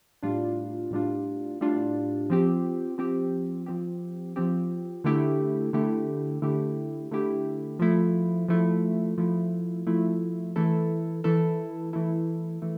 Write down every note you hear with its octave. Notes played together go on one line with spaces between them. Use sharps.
A2 G3 D4 F4
A2 G3 D4 F4
A2 G3 D4 F4
F3 C4 G4
F3 C4 G4
F3 C4 G4
F3 C4 G4
D3 A3 E4 G4
D3 A3 E4 G4
D3 A3 E4 G4
D3 A3 E4 G4
F3 A3 E4
F3 A3 E4
F3 A3 E4
F3 A3 E4
E3 A3 E4 A4
E3 A3 E4 A4
E3 A3 E4 A4
E3 A3